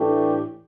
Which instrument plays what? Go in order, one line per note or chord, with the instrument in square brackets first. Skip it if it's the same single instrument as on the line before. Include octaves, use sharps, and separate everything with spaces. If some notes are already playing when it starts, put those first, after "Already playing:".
Already playing: [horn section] A2 E3 A3 D4 G4